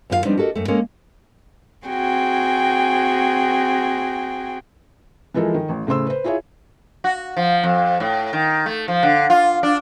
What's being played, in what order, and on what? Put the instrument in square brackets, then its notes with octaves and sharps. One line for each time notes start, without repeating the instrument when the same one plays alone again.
[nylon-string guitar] F#2 D#3 F4 G4 F5
F3 G3 B3 C4 D4 D#4
F#4 G4 A4 A#4 D#5
F#2 A3
G#3 A#3 C#4 A4 A#4
[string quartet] C4 F#4 G#4 G5 G#5
[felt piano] E3 F3 G#3 A4 A#4
D#3
A1
A2 C#3 C5 C6 E6
B4 C5
E4 F4 G#4 C#5 E5
[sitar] F#4
F3
F2
A2
D#3
A3
F3
D3
F4
D4